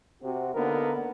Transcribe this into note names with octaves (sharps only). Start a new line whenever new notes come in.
C3 C4 F#4
D3 A#3 B3 D#4 A#4